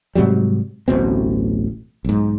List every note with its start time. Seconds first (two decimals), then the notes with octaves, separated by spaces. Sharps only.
0.15 G#2 C3 F#3 G3
0.88 D1 A1 B2 C4
2.05 B1 G#2